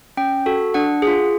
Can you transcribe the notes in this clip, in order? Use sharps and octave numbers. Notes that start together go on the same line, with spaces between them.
C#4 G5
F#4 A4
D4 F#5
F4 G#4